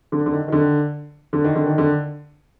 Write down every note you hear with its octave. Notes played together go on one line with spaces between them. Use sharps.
D3
D3
D#3
D#3
D3
D3
D#3
D3
D#3
D3